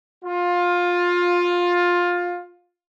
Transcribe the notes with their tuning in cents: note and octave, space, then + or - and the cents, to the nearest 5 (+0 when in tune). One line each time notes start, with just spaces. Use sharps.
F4 +15